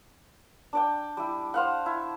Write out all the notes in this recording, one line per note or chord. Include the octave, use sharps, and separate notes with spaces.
D4 D5 G5
G3 E4
C5 F5 F#5
E4